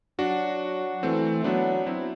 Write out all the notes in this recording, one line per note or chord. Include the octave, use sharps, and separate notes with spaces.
F#3 D4 F#4
E3 A3 C4
F#3 B3 D4
C4 E4